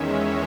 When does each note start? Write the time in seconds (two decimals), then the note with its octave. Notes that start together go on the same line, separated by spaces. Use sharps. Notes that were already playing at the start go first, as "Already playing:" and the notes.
Already playing: E2 D#3 G#3 C#4 C#5 E5